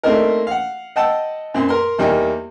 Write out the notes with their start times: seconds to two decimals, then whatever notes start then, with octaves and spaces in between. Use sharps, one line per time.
0.03 A3 A#3 C4 D4 D#4 A#4
0.47 F5 F#5
0.96 D#5 F#5 G5 A5 E6
1.54 F#2 A#2 C4
1.68 A#4 A#5 C6
1.99 E2 G3 A#3 D#4 G5